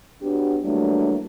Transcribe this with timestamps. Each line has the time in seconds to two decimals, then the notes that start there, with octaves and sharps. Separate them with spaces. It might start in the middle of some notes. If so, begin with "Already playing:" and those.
0.22 F#3 B3 D4 G4
0.63 E3 F#3 G3 A3 A#3 D4